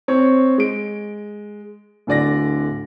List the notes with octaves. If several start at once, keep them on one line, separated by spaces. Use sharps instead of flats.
C4 C#5
G#3 D7
D1 D3 D5 A#6